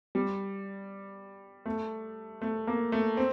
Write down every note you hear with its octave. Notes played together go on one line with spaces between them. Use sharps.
G3
A3
A3
A#3
A3
C4